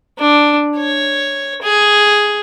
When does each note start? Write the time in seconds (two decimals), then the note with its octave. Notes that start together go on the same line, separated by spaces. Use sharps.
0.19 D4
0.77 C#5
1.62 G#4